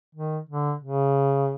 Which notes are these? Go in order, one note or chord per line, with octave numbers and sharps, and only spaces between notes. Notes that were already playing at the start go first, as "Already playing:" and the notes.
D#3
D3
C#3